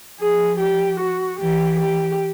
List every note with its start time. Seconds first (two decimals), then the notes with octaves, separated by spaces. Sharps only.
0.20 F3 G#4
0.60 G4
1.00 F#4
1.40 E3 G4
1.80 G4